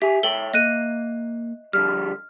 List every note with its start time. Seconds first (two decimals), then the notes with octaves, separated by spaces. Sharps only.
0.02 G4 E5 G#5
0.23 A4 C#5 G5 F#7 G7
0.54 A#3 D#5 F#6 D#7
1.73 D3 F3 G3 F6